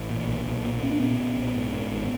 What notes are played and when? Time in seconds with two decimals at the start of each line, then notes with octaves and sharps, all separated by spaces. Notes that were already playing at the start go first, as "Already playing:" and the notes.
Already playing: A1
0.10 A#2
0.28 B1
0.46 B1
0.64 A#2
0.83 A#2 C#4
0.91 D4
1.00 A#2 B3 C#4
1.19 A#2
1.37 B1
1.56 G#2
1.74 G#2
1.92 G#1